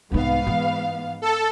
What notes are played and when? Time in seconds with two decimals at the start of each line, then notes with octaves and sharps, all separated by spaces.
0.12 C2 G#2 B3 D#4 F5
0.47 E3
1.22 A4